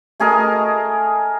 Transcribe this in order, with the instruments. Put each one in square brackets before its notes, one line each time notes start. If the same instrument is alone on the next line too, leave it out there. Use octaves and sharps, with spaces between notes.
[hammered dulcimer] A3 G#4 A#4 D#5